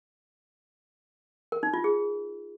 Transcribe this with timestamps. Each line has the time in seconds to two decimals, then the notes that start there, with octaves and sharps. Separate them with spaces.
1.52 A#4
1.63 D#4
1.74 F4
1.84 G#4